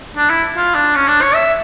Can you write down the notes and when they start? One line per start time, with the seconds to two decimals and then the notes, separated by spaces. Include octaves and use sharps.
0.17 D4
0.30 E4
0.56 F4
0.75 D4
0.95 C#4
1.07 D4
1.22 C#5
1.35 E5